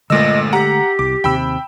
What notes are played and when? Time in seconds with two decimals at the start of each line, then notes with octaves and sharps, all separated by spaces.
0.10 G1 A#2 D3 G#3 A3 D#5 E6
0.53 G4 F#5 A#5
0.99 C2 D6
1.24 D#2 C3 G5 B5 E6